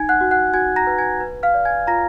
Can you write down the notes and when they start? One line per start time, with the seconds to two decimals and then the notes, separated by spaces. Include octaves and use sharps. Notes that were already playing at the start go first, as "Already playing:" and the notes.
Already playing: D#4 G#5 G#6
0.09 F#5 F#6
0.21 F#4
0.31 F#5 F#6
0.54 F#4 G#5 G#6
0.76 A#5 A#6
0.87 B4
0.98 G#5 G#6
1.21 B4
1.43 F5 F6
1.54 D5
1.65 G#5 G#6
1.87 F4 A#5 A#6